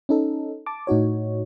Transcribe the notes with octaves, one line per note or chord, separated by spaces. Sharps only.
C#4 D#4 A4
A5 D6
A2 D#4 F#4 C#5